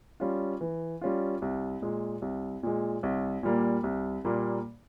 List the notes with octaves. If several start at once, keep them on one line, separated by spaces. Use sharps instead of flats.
G3 C#4 F4
E3
G3 C#4 F4
C2
A#2 G#3
C2
A#2 G#3
C2
A#2 G3 A#3
C2
A#2 G3 A#3